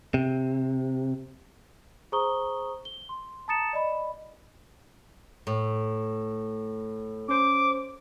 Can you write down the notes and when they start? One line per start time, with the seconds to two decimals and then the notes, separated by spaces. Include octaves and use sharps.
0.14 C3
2.12 G#4 C5 A#5 C#6 D#6 G7
2.85 G7
3.09 C6
3.48 A5 A#5 D#6 A6 C#7 E7
3.73 D5 D#5 B5
5.47 A2
7.28 C#4 C5 D6